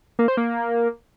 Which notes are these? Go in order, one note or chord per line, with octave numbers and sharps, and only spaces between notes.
A#3
C5
A#3